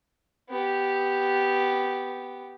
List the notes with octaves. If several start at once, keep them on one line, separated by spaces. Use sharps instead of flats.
B3 G4